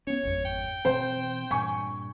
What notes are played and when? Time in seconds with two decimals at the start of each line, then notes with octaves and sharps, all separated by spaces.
0.07 B3 C#4 C#5
0.23 D#1 G#1 F2
0.45 G5
0.85 B2 E3 C4 C5
1.51 G2 A#2 G#5 C#6